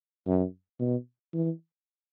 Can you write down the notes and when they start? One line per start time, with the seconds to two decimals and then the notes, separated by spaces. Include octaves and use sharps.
0.27 F#2
0.80 B2
1.34 E3